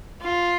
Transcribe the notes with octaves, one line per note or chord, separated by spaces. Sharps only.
F4